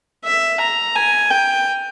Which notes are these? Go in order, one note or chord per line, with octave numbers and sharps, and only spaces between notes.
E5
A#5
G#5
G5